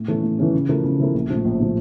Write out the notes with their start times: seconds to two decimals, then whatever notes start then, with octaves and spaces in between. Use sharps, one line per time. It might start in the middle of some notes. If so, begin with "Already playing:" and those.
Already playing: A2
0.08 E3 A3 C#4
0.23 A2
0.39 E3 A3 C#4
0.53 C#3
0.69 F3 A3 E4 A#4
0.84 C#3
0.99 F3 A3 E4 A#4
1.14 A#1
1.30 A2 F3
1.45 A#1
1.60 A2 F3